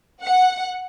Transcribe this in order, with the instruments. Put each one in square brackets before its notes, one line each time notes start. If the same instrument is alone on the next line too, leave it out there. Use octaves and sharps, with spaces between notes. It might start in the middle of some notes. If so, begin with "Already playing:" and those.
[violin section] F#5